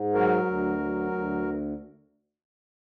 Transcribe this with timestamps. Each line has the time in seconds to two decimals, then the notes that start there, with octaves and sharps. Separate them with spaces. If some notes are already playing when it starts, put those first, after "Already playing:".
Already playing: G#2
0.14 F#3 F#4 A#4
0.46 D2
0.78 F#3
1.11 D2